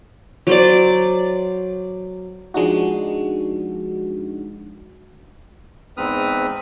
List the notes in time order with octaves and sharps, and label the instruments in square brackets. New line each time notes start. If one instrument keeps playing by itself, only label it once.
[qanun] F#3 C5 D5
[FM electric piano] F3 G#3 D4 D#4 F#4
[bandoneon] E2 G#2 C4 B4 D#6 F6